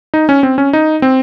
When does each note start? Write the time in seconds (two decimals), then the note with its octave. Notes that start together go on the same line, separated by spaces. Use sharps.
0.14 D#4
0.29 C#4
0.43 C4
0.58 C#4
0.73 D#4
1.02 C4